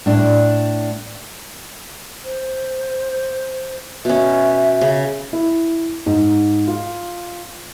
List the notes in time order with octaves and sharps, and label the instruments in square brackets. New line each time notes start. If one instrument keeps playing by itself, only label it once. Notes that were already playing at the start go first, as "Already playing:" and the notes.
[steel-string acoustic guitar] A2 D4
[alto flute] C5
[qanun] B2 C#4 [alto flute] E5
[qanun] C#3
[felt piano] E4
G#2
F4